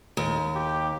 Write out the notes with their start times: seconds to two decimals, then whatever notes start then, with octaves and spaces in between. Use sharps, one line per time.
0.17 D#2
0.56 G4